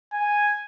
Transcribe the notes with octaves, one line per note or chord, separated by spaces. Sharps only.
G#5